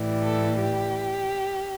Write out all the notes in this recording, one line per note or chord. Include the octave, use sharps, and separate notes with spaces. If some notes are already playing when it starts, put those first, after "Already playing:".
Already playing: A2 E3 G3
A4
G4